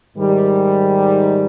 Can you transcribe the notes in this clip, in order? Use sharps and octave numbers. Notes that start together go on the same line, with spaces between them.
G#2 D#3 G3